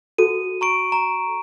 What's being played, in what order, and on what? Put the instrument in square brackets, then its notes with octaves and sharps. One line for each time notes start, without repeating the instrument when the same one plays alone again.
[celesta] F#4 A4 [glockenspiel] D#7
[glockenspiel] A#5 C#6 D7
A#5